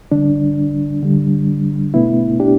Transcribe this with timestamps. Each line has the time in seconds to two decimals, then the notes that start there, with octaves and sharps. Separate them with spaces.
0.12 D3 G3 D4
1.03 D3 G3
1.94 B2 A3 B3 E4
2.40 D4 G4